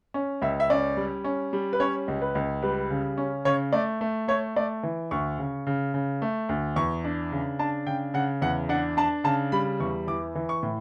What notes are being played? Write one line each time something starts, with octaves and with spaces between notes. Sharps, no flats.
C#4
C#2 E5
E5
C#4 D5
G3
C#4
G3
B4
C#4 C#5
C#2
B4
C#2
G3 B4
C#3
C#4
C#3 C#5
A3 D5
A3
A3 C#5
A3 D5
E3
D2 C#6
C#3
C#3
C#3
A3
D2
E2 C#6
D4
C#3
D4 A5
C#3 G5
C#3 F#5
E2 F#5
D4 F#5
D4 A5
C#3 A5
G3 B5
E2 C#6
E3 D6
E3
C#6
A2